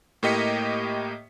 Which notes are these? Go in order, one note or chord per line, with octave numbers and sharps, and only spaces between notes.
A2 A#3 G4 D#5 B6 C#7